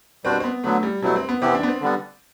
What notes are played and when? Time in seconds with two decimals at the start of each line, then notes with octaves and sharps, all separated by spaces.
0.24 B2 G3 C4 D4 F#4 C5
0.40 C4
0.44 B3
0.64 D3 F#3 A3 B3
0.83 G3
1.03 B2 F#3 G3 A3 E4
1.16 C4
1.29 B3
1.41 C3 E3 B3 C4 E4 G4
1.55 D4
1.63 B3
1.68 C4
1.81 D3 G3 B3